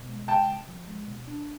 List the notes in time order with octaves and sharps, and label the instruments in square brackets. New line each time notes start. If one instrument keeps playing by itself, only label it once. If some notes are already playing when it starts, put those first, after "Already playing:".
Already playing: [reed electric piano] B2
G#3
[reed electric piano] C3 [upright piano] G5 A5
[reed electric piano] C3
F3
G#3
B2
D4